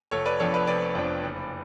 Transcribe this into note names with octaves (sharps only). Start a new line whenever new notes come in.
F1 A4 C#5
B4 D5
F2 F3 B3 D4 A4 C#5
B4 D5
F1 B4 D5
F2 F3 B3 D4
F#1